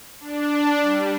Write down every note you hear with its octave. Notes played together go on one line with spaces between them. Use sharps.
D4
G3